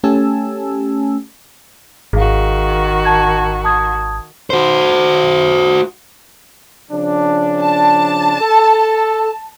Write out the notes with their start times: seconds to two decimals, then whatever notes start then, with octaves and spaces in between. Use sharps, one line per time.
0.04 A3 C#4 G4 G#5 A5 E6
2.13 G#1 D#3 F#4 G#4 F5
3.05 A5 G#6
3.64 A5 D#6 G#6
4.50 F#4 C5
6.91 C#3 F3 D4
7.62 A5
8.41 A4